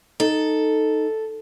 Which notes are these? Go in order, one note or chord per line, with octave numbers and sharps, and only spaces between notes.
D#4 A4